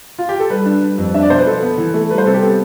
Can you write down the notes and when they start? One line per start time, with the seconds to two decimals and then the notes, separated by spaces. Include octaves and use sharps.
0.19 F4
0.29 G4
0.40 A4
0.50 G3 B4
0.66 D4
0.82 G3
0.98 F2
1.14 D4 E5
1.22 D5
1.30 B2 C5
1.38 B4
1.46 F3 A4
1.63 B3
1.78 E3
1.94 A3
2.10 G3 B4
2.18 C5
2.26 C3 A4
2.34 G4
2.42 B3 A4